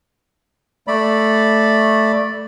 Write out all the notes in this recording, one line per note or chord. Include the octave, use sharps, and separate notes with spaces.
A3 D5 B5